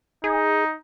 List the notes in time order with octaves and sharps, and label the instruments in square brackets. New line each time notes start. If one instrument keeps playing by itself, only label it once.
[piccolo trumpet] D#4 [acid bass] G#4